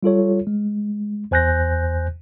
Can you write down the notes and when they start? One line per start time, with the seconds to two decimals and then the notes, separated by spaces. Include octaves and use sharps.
0.03 G3 F4 A4 C#5
0.47 G#3
1.31 E2 C5 G#5 F#6 G6 A#6